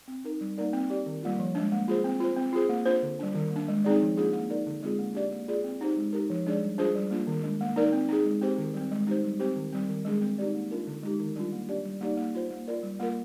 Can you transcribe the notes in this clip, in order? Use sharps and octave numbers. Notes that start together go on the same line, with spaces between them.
C4
D#4 A#4
G3
A#3 D#4 A#4 D5
C4
G4 D5
D#3
G3 A#3 F4
F3
G#3 D4
A#3
F4 G#4 C5
C4
F4 C5
C4
F4 G#4 C5
A#3
D4 F4 C5
D3
G3 D4
D#3
A#3
D4
G#3
C4 D#4 G#4 D5
F3
A#3 D4 F4 G#4
A#3
D#4 A#4 D5
D3
G#3 C4 F4 G#4
A#3
D4 G4 D5
A#3
F4 G#4 D5
C4
D#4 G4 C5
G#3
D#4 G4 A#4
F3
G#3 D4 G#4 D5
G3
D4 F4 G#4 C5
G3
A#3 D4 F4
D#3
G#3 D4
A#3
D#4 A#4 D5
C4
D#4 G#4
G#3
C4 G4 C5
D#3
G3 C4
G#3
D#4 G4 C5
G3
C4 G4 C5
D#3
G3 C4
D#3
G#3 D4 G#4
C4
D#4 G4 D5
A#3
D4 F4 A#4
D3
G#3 D#4 G4
D#3
G3 D4 F4
A#3
D4 G4 D5
G3
A#3 D#4 G4 D5
A#3
F4 C5
A#3
F4 A#4 D5
G3
A#3 F4 A#4